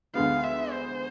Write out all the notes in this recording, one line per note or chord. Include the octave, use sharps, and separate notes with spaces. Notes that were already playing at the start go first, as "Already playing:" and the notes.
D2 D3 G#3 B3 F5
E5
C5